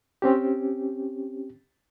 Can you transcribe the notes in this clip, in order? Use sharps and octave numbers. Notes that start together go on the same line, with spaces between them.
C4 C#4 G4